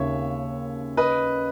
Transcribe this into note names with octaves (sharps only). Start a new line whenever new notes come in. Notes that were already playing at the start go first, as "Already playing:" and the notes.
Already playing: D#2 C#3 C#5 E5
B4 D#5